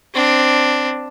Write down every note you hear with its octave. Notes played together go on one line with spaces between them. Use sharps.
C4 D4